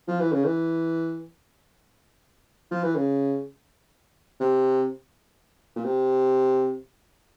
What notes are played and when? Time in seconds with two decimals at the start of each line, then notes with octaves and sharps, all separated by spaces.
0.08 F3
0.20 E3
0.32 C#3
0.45 E3
2.71 F3
2.84 E3
2.96 C#3
4.40 C3
5.76 A#2
5.85 C3